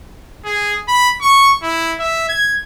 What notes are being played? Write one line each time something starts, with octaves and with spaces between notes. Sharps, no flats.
G#4
B5
C#6
E4
E5
G#6